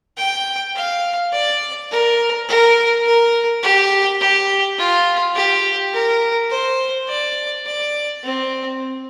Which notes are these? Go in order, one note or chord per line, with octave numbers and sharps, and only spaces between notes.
G5
F5
D5
A#4
A#4
A#4
G4
G4
F4
G4
A#4
C5
D5
D5
C4